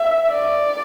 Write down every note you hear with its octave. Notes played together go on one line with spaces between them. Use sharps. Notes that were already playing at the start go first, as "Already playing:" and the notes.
Already playing: E5
D5